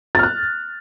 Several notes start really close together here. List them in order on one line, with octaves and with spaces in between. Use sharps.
A6 F6 F#6